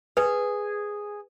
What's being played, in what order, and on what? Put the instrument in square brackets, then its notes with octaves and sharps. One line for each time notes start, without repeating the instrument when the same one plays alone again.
[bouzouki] G#4 [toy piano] B4